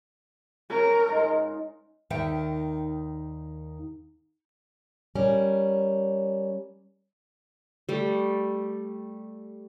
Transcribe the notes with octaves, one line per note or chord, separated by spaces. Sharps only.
C#3 A#4 C#5
G#2 G#3 F4
D#2 D#3 D#4 D5 E5 G5
G3 C#4 A#4
G3 A3